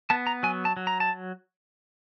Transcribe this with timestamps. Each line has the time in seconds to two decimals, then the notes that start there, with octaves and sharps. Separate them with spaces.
0.10 B3 A5
0.27 A#5
0.43 F#3 G#5
0.65 A5
0.77 F#3
0.87 A#5
1.00 A5